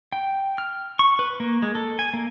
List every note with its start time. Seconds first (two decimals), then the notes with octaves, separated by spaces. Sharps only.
0.12 G5
0.58 F6
0.99 C#6
1.19 B4
1.40 A#3
1.62 G#3
1.75 A4
1.99 G#5
2.14 A#3